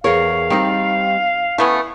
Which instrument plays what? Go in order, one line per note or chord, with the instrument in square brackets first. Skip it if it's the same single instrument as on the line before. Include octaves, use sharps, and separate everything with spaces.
[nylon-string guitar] E2 G#4 A#4 [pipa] C#5 [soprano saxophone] F5
[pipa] D#3 [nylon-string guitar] G3 C4 D#4
[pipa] A3 B3 C#4 [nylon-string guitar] E4